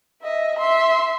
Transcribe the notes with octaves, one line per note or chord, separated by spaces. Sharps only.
D#5 E5
E5 C6